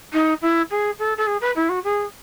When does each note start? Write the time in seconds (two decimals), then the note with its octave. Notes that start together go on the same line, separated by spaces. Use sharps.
0.13 D#4
0.42 E4
0.71 G#4
0.99 A4
1.17 A4
1.27 G#4
1.41 B4
1.56 E4
1.69 F#4
1.84 G#4